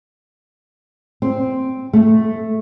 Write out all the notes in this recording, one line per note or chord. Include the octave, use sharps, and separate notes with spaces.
C4
A3